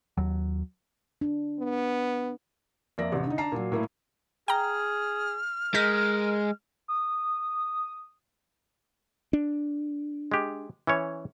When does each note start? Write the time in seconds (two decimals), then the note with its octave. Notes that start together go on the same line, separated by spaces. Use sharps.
0.17 D#2 F#3
1.21 D4
1.59 B3
2.98 F2 A#3 D5 E5 A#6
3.12 A1 C3
3.26 D3 D#4
3.38 D4 A5 A#5 C7
3.52 A#2 F#3
3.72 A2 A#3 E4
4.48 G#4 G5 A#5 F6
5.74 G#3 A#4 G6 A#6 B6
6.88 D#6
9.33 D4
10.32 G#3 G4
10.87 E3 C#4 C#5